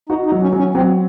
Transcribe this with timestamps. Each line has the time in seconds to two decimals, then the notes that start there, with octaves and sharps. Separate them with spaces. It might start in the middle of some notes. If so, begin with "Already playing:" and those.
0.09 D#4 F#4
0.26 D#4
0.32 F#3
0.42 C#4
0.53 F#3
0.59 C#4
0.75 F#3 C4